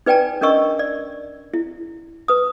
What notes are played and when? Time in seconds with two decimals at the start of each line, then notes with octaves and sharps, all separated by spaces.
0.06 D#4 B4 D5 G5 G#5 A#5
0.41 C#4 D4 A#4 D#5 C#6 E6
0.79 D5
1.54 E4
2.28 B4 D#6